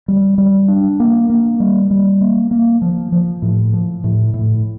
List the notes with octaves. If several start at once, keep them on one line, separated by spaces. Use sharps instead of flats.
G3
G3
D4
A#3
A#3
G3
G3
A#3
A#3
F3
F3
A2
F3
A2
A2